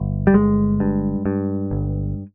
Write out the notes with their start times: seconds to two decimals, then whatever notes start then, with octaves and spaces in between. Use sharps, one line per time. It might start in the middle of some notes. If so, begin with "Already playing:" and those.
Already playing: G1
0.27 G3
0.34 G1 G#3
0.80 G2
1.26 G2
1.71 G1